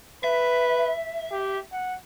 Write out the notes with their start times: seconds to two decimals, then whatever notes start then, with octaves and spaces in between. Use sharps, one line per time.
0.24 B4 E5
1.32 G4
1.72 F#5